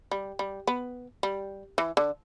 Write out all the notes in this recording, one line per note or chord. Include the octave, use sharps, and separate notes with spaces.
G3
G3
B3
G3
E3
D3